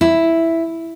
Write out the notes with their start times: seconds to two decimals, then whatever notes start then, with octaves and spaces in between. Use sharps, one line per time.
0.01 E4